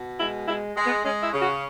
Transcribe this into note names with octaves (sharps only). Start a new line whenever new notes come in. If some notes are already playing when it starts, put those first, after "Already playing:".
Already playing: B2
G#3 E4
G#3 E4
G#3
B3
G#3 C#4
E4
C#3
F#4